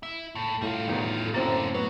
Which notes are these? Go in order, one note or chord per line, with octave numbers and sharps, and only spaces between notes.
E4
A2
A2 G3 F4
E2 D#3
F#2 A2 D3 A#3 C4 A6
F#3 B3